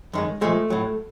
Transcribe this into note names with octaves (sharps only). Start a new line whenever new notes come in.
F#2 D#3 G#3
A#2 F3 G#3 A3
A2 F#3